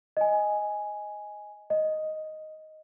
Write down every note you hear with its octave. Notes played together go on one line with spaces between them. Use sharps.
D#5 G#5
D#5